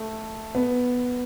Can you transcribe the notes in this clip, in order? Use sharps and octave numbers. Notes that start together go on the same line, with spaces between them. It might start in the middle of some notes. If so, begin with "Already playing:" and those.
Already playing: A3
B3